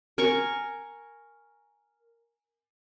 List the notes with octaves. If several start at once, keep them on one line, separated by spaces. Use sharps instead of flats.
A#4 G#5 C#6